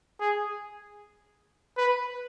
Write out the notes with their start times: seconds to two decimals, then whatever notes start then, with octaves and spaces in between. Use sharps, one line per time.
0.20 G#4
1.77 B4